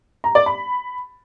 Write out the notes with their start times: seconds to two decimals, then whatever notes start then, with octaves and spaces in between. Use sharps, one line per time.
0.24 A#5
0.35 D5
0.46 B5